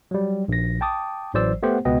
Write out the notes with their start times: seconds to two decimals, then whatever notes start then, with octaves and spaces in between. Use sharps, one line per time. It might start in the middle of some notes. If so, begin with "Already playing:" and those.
0.11 F#3 G3
0.48 A#1 A#6
0.81 G5 A5 D6 D#6
1.34 A1 E3 F#3 C5 D5 E6
1.63 A3 B3 G4 C5 F#5
1.85 C#2 B2 B3 D#5 G5